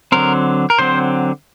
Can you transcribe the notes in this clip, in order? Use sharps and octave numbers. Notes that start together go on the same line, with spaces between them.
D3 F#3 C4 A#4
A#4
D3 F#3 C4 C5